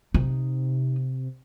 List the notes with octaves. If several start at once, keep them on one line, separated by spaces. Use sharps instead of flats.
C3 D#4